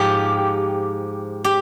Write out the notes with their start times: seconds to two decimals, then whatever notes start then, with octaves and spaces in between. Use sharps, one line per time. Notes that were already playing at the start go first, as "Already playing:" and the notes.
Already playing: G#2 F3 G4
1.44 G4